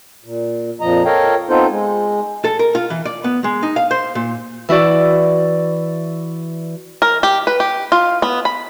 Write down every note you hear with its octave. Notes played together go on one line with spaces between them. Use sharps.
A#2
F2 A#2 F3 D#5 A#5
A4 A#4 C#5 D#5 F5 G5
B3 C4 D#4 F4 A4 C5
G#3
A4
A#4
F4
E3
D5
B3
G#3
D#4
F5
C5
A#2
E3 E4 F#4 D5
A#4
G4
B4
G4
F4
B3
B5